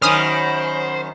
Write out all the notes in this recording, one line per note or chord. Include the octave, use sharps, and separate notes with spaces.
F#2 D#3 C#4 C5 B5 D#6 F6